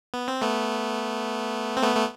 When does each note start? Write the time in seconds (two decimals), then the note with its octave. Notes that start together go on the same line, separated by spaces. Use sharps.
0.14 B3
0.28 C4
0.42 A3 B3
1.77 C4
1.83 A3 B3
1.96 A3